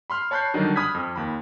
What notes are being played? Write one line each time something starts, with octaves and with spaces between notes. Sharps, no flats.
B5 C6 F6
C#5 A5 B5 F#6 G6 C7
D3 D#3 F#3 G3 D4 D#4
B5 D#6 F6 F#6 G#6 B6
F2
D#2 B5